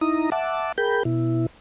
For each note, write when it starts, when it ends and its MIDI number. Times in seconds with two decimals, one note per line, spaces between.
0.01 0.30 63
0.01 0.30 64
0.01 0.30 82
0.01 0.30 87
0.32 0.72 76
0.32 0.72 78
0.32 0.72 81
0.32 0.72 86
0.78 1.03 68
0.78 1.03 70
0.78 1.03 79
0.78 1.03 83
0.78 1.03 91
1.05 1.46 47
1.05 1.46 64